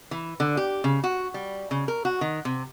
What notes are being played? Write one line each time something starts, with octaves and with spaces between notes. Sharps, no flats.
E3
D3
G4
C#3
F#4
G3
C#3
A#4
F#4
D#3
C3